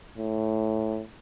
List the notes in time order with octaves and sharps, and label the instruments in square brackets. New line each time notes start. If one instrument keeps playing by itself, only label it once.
[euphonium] A2